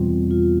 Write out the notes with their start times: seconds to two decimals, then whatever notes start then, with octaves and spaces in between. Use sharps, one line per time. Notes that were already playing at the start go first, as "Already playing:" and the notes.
Already playing: E2 B2 G3 C4 F4
0.31 F4